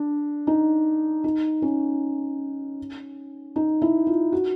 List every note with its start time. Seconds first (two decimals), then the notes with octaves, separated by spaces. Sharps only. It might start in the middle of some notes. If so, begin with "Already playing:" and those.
Already playing: D4
0.47 D#4
1.24 D#4
1.62 C#4
3.56 D#4
3.82 E4
4.07 F4
4.32 F#4